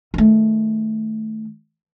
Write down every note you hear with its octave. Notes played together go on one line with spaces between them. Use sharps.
D#3 A3